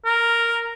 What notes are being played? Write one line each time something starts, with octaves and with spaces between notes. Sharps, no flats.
A#4